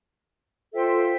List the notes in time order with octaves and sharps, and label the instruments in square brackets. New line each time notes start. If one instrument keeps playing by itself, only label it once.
[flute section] F4 A4 C5 E5 G5